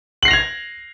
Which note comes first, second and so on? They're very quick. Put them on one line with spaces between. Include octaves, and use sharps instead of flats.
F#7 C7 A#6 F7 G#6